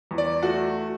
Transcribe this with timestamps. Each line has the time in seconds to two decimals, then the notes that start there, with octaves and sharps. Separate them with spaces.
0.11 E2
0.18 D5
0.43 A3 F#4